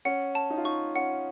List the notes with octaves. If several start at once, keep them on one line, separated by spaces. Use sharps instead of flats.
C#4 F#5
A5
D#4
F4
D#4 C#6
C#4 F#5